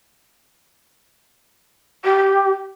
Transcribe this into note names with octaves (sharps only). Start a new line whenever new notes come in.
G4